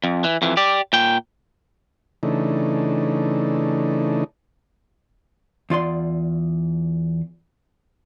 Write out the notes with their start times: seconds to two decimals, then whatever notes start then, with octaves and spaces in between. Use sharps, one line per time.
0.04 F2
0.24 E3
0.42 F2 E3
0.57 G4 D5
0.93 A#2 G5
2.23 C#3 E3 A3 D4 D#4
5.70 E2 F4 D5 C6